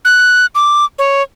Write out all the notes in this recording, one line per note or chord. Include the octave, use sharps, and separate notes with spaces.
F#6
D6
C#5